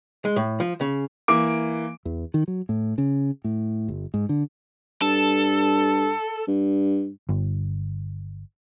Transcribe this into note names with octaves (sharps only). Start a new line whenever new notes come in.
G#3
A2
F3
C#3
E3 A#3 D6 D7
E2
D#3
F#3
A2
C#3
A2
G1
G#2
D3
G2 A4
G2
G1